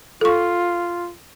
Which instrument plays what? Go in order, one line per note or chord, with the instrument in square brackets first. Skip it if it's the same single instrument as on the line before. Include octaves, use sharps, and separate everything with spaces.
[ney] F4 [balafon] A4 C#6